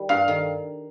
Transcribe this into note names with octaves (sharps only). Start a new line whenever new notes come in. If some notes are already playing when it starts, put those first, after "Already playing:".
Already playing: D#3 G3
G2 F5
D#3